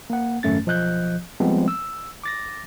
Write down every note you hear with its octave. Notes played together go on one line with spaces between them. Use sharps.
A#3 F#5
G#1 F#2 A3 C#4 A6
B1 F3 D#5 F#6 G6
F3 G3 G#3 B3 C4
E6
D6 A6 A#6